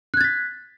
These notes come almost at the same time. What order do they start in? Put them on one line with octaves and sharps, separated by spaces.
F#6 G#6 A6 B6